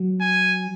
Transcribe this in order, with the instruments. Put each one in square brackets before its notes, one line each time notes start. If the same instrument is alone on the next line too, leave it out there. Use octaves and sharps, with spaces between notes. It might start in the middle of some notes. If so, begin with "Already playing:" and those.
Already playing: [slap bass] F#3
[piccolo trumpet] G#5